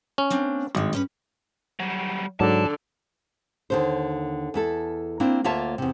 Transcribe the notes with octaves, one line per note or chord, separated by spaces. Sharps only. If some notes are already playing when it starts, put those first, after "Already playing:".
C#4
A#3 C4 D4
G#1 G2 G#3
G2 C#4 B4
F#3 G3
G#2 D3 F#3 D5 A5
D#2 D3 C5
E2 E4 A4
A#3 C4 D4 E4
D2 A#3 F4 C#5 E5 A5
E2 C3